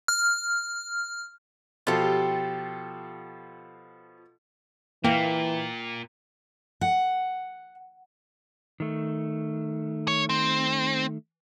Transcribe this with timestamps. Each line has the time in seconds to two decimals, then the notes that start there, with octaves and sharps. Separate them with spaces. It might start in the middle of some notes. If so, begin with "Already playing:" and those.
0.08 F6
1.87 B2 F3 F4 G4 A4
5.04 A#2 E3 A#3 G5
6.81 F#5
8.80 D#3 A3
10.08 C#5
10.29 C4